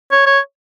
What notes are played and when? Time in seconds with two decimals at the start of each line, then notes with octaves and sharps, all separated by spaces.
0.11 C#5
0.26 C#5